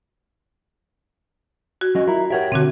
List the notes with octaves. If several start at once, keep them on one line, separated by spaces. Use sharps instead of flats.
F#4 G#6
F#3 C#4 D#5
E4 F4 A#4 A#5
G4 A#4 C#5 E5 F#5 G5
B2 D3 C4 D4 F#4